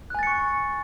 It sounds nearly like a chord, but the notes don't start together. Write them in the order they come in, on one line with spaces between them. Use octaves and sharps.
F#6 G#5 A6 C#7 C#6